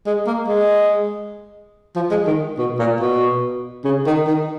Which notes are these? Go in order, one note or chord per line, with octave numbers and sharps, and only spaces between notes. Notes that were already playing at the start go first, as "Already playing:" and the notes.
G#3
A#3
G#3
F3
G#3
D#3
B2
A#2
B2
C#3
D#3
D#3